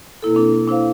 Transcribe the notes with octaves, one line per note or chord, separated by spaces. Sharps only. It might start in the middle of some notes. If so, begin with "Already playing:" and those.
B2 A#3 E4 A4
C4 D4 A4
D4 E4 C5 F5